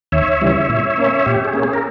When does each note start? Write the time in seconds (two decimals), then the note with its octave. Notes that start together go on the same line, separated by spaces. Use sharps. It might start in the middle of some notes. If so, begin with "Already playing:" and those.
0.12 D#2 C#5 E5
0.41 C#3 E3 G3
0.69 A#2
0.97 A#3 C#4
1.26 A#2 G4
1.45 G#4
1.54 A#3 C#4
1.63 G#4
1.73 A#4